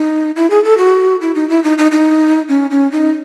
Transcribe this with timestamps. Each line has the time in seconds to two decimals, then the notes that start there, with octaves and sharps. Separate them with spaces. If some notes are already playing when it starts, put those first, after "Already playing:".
Already playing: D#4
0.36 E4
0.50 G#4
0.64 A4
0.78 F#4
1.21 E4
1.35 D#4
1.50 E4
1.64 D#4
1.78 D#4
1.92 D#4
2.49 C#4
2.71 C#4
2.92 D#4